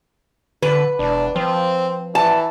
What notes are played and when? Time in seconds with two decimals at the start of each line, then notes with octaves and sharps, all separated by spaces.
0.62 D3 B4
0.99 E1 D4
1.36 F3 C4
2.15 E3 A5